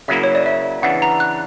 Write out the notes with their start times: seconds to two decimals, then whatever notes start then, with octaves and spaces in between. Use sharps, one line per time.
0.08 C#3 F#3 A#3 E4 E5
0.23 C#5
0.35 D5
0.46 E5
0.82 C#3 E3 B3 D4 F#5
1.02 A#5
1.20 F#6